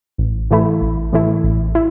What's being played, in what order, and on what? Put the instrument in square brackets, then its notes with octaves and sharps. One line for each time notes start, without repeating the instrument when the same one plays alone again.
[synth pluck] A1
A2 E3 A3 E4
A1
A2 E3 A3 E4
A1
E4